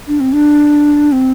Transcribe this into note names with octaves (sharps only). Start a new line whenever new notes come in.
D4
C4
D4
C4